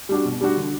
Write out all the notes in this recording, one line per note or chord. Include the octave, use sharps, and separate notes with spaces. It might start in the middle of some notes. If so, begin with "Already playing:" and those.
G3 D4 F#4
B2
G3 D4 F#4
D3